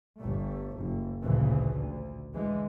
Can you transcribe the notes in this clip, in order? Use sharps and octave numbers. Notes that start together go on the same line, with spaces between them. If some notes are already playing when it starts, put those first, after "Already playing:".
G1 G3 A3
F#1
A1 D2 A#2 C#3 E3
D2
D3 E3 G#3